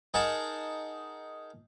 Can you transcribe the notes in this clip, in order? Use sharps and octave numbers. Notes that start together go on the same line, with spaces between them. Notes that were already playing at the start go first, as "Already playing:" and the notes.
D#4 G#4 A#4 F#5 A5